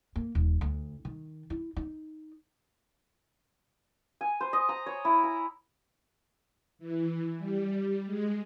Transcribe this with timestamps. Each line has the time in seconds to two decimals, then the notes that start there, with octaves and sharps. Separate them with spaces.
0.16 A#3
0.35 D#1
0.61 D2
1.05 D#3
1.50 E4
1.77 D#4
4.21 G#5
4.41 C5
4.53 D#5
4.69 A#5
4.86 C#5
5.05 E4
5.23 A#5
6.79 E3
7.38 G3
8.06 G#3